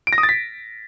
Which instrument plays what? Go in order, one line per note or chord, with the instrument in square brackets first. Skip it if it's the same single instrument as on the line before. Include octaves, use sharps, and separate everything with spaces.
[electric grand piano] D7
A#6
D#6
A6
B6